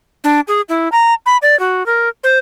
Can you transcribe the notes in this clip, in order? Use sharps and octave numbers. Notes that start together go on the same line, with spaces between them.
D4
G#4
E4
A#5
B5
D5
F#4
A#4
C5